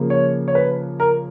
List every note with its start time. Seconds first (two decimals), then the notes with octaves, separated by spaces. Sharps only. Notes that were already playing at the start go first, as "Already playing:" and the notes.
Already playing: C#3 F3 A#3
0.10 C#5
0.48 C#5
0.55 B4
1.00 A#4